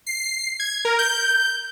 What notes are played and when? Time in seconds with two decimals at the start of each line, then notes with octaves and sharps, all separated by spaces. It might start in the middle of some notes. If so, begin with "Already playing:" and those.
0.07 C7
0.60 G#6
0.85 A#4
0.99 G6